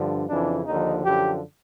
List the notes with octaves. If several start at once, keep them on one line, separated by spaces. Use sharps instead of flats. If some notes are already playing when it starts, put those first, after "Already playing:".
Already playing: G2 D3 F3
F2 C#3 E3 D4
D#2 D3 F3 D#4
F#2 D3 F3 G4